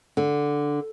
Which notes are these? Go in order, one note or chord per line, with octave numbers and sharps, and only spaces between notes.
D3